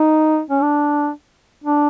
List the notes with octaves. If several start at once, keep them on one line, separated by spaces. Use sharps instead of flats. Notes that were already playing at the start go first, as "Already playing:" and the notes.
Already playing: D#4
C#4
D4
D4